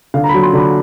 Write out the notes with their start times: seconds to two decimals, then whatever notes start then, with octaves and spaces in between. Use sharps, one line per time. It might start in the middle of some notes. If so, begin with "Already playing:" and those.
0.14 D3 F5
0.24 A#5
0.29 B5
0.34 F#3
0.43 C6
0.53 D3 B5